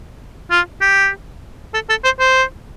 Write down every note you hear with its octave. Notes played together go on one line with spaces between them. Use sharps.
F4
G4
A4
A4
C5
C5